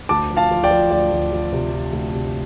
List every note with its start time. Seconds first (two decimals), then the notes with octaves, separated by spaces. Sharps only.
0.09 D2 A5 D6
0.30 F3
0.36 F5 A5
0.51 F3
0.64 D5 G5
0.71 F3
0.91 D2 D5
1.12 D2
1.32 D2
1.53 C3
1.72 F3
1.93 D2
2.13 C3